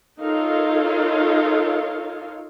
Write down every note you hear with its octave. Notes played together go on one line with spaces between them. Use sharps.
D#4 F4 A4 A#4 C#5 F5